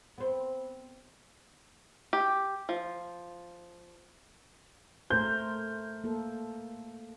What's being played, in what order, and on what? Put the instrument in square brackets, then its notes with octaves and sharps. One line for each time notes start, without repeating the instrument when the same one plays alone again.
[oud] B3 C4
[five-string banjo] G4
F3
[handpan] A3 A#4 C5 [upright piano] G6
[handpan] A#3 A4